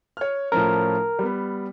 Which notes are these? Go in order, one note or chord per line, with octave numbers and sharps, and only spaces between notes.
C#5 F6
A2 F3 C#4 A#4
G3 B3